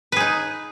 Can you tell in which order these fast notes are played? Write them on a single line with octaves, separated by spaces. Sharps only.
B4 G#4 D#4